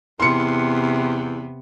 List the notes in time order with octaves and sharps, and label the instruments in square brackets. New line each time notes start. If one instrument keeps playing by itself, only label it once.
[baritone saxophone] E2 [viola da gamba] C3 B3 [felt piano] C6 C#7